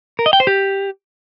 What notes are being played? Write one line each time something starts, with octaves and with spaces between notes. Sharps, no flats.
A#4
D#5
G5
C5
G4